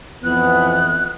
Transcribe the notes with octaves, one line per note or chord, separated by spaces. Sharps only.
F2 E3 B3 F#6